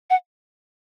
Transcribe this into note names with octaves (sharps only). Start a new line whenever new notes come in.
F#5